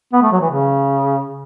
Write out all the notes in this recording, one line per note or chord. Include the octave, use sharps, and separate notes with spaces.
B3
A3
F#3
E3
C#3